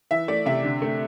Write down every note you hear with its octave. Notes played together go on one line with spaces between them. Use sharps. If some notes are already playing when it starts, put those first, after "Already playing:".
E3 E5
A3 D5
C3 E5
D3
A3